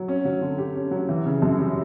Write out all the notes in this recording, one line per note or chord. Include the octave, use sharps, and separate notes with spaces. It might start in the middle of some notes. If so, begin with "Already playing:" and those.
Already playing: F#3
C#4
F#3
D3
G4
C#4
F#3
E3
C#3
F#2
G3